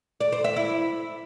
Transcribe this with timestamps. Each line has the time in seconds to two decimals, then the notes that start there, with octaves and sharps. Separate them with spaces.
0.20 D5
0.32 C5
0.44 E5
0.56 E4